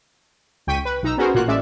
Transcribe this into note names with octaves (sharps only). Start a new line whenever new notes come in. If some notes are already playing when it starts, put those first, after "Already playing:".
C#2 G5 C#6 B6 D#7
B4
B1 D#4 A#5 E6
B3 C#4 F#4 G#4 A#4 C5
A1 A#2 A#3 F4 F#4 F#6
A1 G#3 C#4 D5 E5